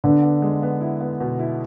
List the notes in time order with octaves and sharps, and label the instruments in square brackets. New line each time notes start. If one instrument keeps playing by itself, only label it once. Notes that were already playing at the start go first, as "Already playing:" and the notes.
[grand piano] D3 [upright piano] B3
[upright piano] B3
G#3
B3
E4
B3
B2
E4